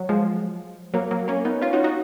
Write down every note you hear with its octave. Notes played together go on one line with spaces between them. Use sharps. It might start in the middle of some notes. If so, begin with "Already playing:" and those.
Already playing: F#3
F3 G#3
F#3 A#3
F#3 A#3
A#3 C#4
B3 D#4
C#4 F4
D#4 F#4
D#4 F#4